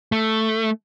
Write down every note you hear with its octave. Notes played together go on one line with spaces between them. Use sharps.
A3